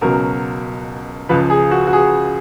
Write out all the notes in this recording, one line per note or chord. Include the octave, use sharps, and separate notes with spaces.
C#2 B2 F#3 A#4
C#2 C#3 F3 B4
G#4
F#4
F#4
G#4